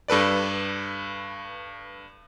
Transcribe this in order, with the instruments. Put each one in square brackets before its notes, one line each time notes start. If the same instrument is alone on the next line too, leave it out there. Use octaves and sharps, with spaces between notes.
[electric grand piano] G2 A4 B4 D5